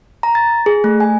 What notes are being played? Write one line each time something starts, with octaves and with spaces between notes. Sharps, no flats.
A#5
A6
G#4
A3
G#5